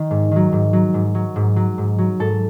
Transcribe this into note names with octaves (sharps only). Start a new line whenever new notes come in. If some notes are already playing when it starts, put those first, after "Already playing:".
Already playing: D#3
G#2
D#3 F#3
G#2
F#3
G#2
F#3
G#2
F#3
G#2
F#3
G#2 A4